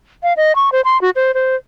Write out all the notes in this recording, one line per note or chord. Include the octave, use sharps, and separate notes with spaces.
F5
D#5
C#6
C5
C6
F#4
C5
C5